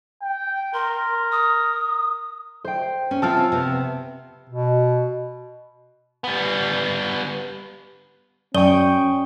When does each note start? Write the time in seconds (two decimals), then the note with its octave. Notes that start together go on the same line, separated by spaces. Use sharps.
0.21 G5
0.74 A#4 C6
1.32 D#6
2.64 C5 G5
3.11 C#4
3.22 C#3 F3 C4 A5 E6 F6
3.52 C3 B3
4.49 B2
6.24 G3 B3
8.54 F#2 C#4 D5 G5 C#6 D#6 G7